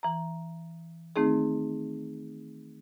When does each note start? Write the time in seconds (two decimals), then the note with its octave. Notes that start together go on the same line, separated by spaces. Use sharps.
0.03 E3 A#5
1.16 D#3 A3 C4 D#4 G#4